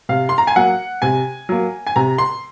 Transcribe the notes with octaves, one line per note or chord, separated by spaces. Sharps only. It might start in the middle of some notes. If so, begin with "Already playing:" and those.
C3 F5
C6
A#5
G#5
F#3 A#3 F#5
C3 G#5
F#3 A#3
G#5
C3 A#5
C6